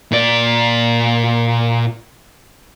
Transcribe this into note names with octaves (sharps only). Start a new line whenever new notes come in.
A#2 D5